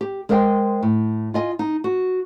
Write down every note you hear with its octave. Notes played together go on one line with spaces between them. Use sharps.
G4
G#3 A#4 C5 D#5 E5 G5
A2
F4 D#5 G#5
D#4
F#4